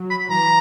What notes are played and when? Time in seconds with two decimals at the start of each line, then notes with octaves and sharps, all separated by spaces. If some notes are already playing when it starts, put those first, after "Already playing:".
Already playing: F#3
0.10 B5
0.30 E3 A#5